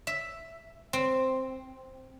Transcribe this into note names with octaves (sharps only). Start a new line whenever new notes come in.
E5
C4